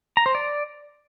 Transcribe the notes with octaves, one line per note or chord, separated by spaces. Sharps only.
A#5
C5
D5